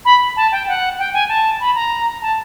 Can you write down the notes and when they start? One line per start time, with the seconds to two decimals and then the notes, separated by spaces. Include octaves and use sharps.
0.05 B5
0.36 A5
0.52 G5
0.68 F#5
0.99 G5
1.14 G#5
1.29 A5
1.60 B5
1.75 A#5
2.22 A5